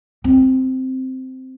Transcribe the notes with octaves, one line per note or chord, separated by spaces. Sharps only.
C4